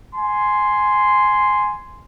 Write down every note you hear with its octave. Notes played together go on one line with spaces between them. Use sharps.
G#5 C6